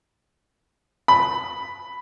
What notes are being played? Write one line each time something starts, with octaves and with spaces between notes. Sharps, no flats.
B5